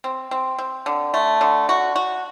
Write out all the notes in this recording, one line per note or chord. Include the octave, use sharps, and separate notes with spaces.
C4
C4
C4
D3
A3
D3
F#4
F#4